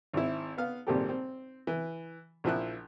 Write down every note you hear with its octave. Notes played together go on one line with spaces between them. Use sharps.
G#1 C4 E4
B3 F5
G#1 A#2 G3 C4 G4 A4
C4
E3
A#1 F3 E4 F#6